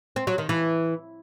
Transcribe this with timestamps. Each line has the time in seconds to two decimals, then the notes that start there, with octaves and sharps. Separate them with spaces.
0.16 C4
0.27 F#3
0.38 D#3
0.49 E3